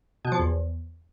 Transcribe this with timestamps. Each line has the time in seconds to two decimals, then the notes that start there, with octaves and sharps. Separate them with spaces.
0.25 B2
0.32 F3
0.39 E2